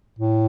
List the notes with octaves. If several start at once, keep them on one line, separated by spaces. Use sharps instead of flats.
A2